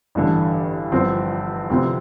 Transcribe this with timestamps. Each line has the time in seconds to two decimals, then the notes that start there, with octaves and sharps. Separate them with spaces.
0.15 A1 G2 D3
0.92 G1 G2 F3 C4
1.70 D2 C3 F3 C4